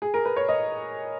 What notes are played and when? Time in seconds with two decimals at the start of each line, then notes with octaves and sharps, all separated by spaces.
0.02 G#4
0.14 A#4
0.25 B4
0.36 C#5
0.48 D#5